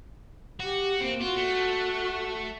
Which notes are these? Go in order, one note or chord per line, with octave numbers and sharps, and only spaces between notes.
F#4 G4
A#3 C4
F4 F#4
A3